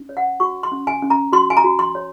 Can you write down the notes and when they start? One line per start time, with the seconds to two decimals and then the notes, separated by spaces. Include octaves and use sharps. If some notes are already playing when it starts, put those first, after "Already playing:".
Already playing: C#4
0.09 C#5
0.17 F#5
0.40 F#4 C#6
0.63 C6
0.72 C#4
0.87 G#5
1.02 C#4
1.10 A#5
1.32 F#4 C6
1.50 G#5
1.57 A#5
1.64 F#4
1.79 C6
1.95 C#5